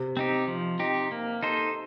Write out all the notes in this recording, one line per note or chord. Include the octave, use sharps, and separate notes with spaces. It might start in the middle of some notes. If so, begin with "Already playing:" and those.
Already playing: C3
C4 D#4 G4
F3
C4 D#4 G4
A#3
D#4 A4 C5